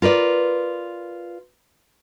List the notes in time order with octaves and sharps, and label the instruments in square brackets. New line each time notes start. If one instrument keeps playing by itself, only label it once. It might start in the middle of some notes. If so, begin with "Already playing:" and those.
[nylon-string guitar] F4 A#4 B4 D5